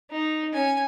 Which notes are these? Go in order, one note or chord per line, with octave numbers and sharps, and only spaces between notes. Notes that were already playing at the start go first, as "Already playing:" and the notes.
D#4
C#4 G#5